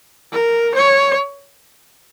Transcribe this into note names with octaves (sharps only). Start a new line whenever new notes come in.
A#4
C#5